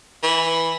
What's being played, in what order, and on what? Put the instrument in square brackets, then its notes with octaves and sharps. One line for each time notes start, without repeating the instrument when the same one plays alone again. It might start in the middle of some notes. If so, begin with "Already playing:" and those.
[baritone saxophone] E3